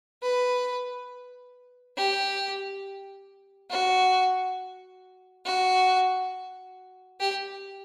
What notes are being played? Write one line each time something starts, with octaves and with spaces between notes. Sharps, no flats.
B4
G4
F#4
F#4
G4